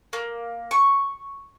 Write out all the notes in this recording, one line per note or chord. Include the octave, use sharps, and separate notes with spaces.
A#3
C#6